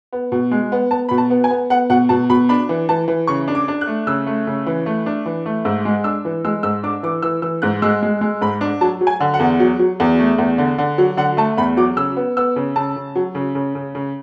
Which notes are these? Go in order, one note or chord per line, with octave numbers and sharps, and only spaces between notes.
B3
B2
G#3
B3
B3 A5
B2 B5
A5
B3
G#5
B3
B3 F#5
B2 F#5
B2 A5
B2 B5
D4 B5
E3
E3 A5
E3
C#3 C#6
D4
D6
D4
F#6
A3
C#3 E6
A3
C#3
E3
A3
D4
E3
A3
G#2 E6
G#3
D4 E6
E3
G#3 E6
G#2 E6
D4 D6
E3 D6
E3 E6
E3 E6
G#2 F#6
G#3 E6
G#3
G#3
G#2 B5
D4
F#3 A5
F#3
G#5
D3
F#5
E2
F#3
F#3
E2
A3
E2
D3
D3
F#3
D3 F#5
A3 A5
E2 B5
F#3 D6
C#3 E6
B3
B3 E6
C#3
C#3 A5
C#3
F#3
C#3
C#3
C#3
C#3